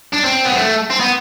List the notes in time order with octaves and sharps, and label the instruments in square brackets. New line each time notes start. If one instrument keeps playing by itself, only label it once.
[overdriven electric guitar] D4
C4
B3
A3
C4
B3